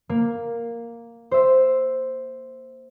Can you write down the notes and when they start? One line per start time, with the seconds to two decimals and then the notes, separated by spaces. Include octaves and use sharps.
0.09 A#3
1.31 C5 E5